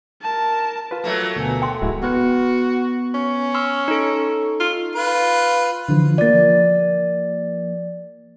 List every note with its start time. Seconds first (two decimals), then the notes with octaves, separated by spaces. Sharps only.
0.22 A#4 A5
0.91 F4 B4
1.04 F#3 A3 A#3
1.36 D2 B2 G#5
1.62 G5 C6
1.82 D1 G#3 E4 F#4
2.03 B3 F#4 B4
3.14 C#4
3.54 C6 E6 F6
3.88 D#4 A4
4.60 F4
4.95 F4 B4
5.89 D3 E3 F3
6.18 F3 A#3 D5 A6